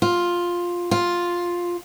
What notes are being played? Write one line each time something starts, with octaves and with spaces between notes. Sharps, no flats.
F4
F4